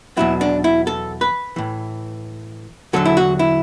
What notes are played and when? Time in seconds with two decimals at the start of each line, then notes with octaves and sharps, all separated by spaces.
0.17 E2 B2 F#3 E4
0.41 D4
0.64 E4
0.87 A4
1.21 B4
1.56 A2 E3
2.93 E2 D3 F#3 A4
3.06 E4
3.17 F#4
3.39 E4